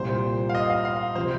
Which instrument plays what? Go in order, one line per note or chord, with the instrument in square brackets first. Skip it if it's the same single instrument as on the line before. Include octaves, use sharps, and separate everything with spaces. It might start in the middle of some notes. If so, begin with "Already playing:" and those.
Already playing: [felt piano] C2 A#2 A#3 F4 [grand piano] C5
[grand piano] F5
D#5
F5
F5
[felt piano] C3 F3 [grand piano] C5